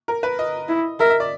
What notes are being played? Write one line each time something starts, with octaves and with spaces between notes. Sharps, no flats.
A#4
B4
D#5
E4
A#4 E5
E5
D5